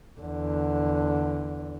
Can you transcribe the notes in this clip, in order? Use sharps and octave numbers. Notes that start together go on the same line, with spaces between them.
E2 D3